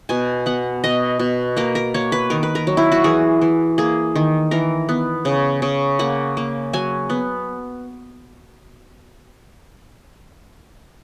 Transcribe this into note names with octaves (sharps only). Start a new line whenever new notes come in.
B2 G#5
B3 F#5
B2 D#5
B2
A#3 A#4
A#4
A#3 C#5
B4
D#3 A#4
B4
A#4
F#3
E4
F#4
E3 G#4
E3
A#3 G#4
D#3
E3 A#4
B3
C#3
C#3
A#3 F#5
A#3
F#3 G#5
B3